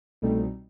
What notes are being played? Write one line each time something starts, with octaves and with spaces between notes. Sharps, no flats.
C2 B2 G3 A3 C4 D#4